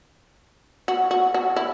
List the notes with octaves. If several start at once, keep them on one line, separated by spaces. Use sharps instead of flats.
F#4
F#4
F#4
E4